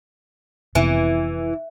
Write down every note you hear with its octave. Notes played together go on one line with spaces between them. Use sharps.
F1 C3 E3 B3